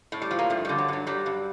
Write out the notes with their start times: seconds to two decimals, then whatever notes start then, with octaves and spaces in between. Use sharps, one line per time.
0.12 A2
0.22 G3
0.31 F3
0.39 A#3
0.50 G2 A3
0.65 D3 G3
0.78 F#3
0.88 G2 F#3
1.07 F#3 G3
1.26 G2